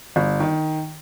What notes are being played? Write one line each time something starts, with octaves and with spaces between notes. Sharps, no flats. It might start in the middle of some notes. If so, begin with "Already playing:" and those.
G1
D#3